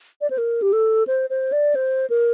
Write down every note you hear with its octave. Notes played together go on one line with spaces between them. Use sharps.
D5
C5
A#4
G4
A4
C5
C5
D5
C5
A#4